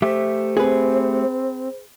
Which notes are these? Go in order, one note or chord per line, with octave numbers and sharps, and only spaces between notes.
A3 G4 C5 E5
C4 G#4 B4